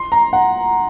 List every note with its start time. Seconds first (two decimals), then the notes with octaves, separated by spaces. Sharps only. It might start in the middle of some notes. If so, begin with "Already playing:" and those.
Already playing: C6
0.12 A#5
0.33 F#5